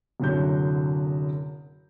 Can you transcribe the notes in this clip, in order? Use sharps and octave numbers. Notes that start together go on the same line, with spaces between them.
F#1 C2 D3 F#3 G6